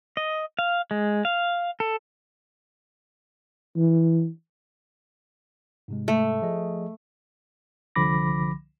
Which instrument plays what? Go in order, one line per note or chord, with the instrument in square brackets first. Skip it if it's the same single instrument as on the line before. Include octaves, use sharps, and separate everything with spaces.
[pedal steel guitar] D#5
F5
G#3
F5
A4
[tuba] E3
[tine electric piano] G#2 C3 G#3
[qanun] A3
[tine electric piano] F3 G#4 D#5
C2 D3 F3 B5 D6 A#6